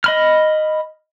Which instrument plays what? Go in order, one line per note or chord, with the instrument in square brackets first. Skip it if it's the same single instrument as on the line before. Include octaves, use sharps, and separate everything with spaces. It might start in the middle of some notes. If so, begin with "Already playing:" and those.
[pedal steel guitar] D#5 B5 F6